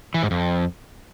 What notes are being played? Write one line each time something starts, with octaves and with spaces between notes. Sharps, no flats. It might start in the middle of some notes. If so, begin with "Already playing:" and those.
E3
G#2
F2